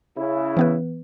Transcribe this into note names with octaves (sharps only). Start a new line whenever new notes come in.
C#3 E4
E3 B3 B4